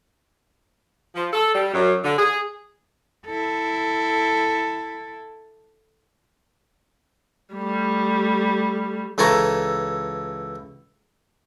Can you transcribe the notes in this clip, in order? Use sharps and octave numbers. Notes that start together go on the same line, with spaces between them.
F3
A4
G3
F#2
D3
G#4
E4 A4
G3 A3
C#2 E3 A4 G#5 A#5 C#6